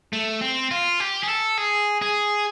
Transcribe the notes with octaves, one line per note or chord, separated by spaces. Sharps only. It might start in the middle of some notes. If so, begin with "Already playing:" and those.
A3
C4
F4
G4
G#4
A4
G#4
G#4